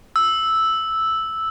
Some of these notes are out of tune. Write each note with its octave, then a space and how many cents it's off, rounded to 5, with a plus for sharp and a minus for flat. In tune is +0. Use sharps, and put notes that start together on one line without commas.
E6 -5